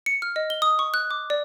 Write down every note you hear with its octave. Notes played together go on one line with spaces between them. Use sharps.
C#7
F6
D#5
G7
D#6
C#6
F#6
D6
D5